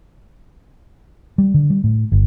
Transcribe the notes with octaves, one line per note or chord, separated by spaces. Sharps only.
G3
D3
G3
A2
G1